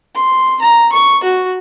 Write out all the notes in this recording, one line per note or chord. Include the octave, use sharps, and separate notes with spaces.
C6
A#5
C#6
F#4